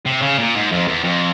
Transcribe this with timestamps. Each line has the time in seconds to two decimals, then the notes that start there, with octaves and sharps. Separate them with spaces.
0.06 C3
0.22 C#3
0.39 A#2
0.55 G#2
0.72 F2
0.88 E2
1.04 F2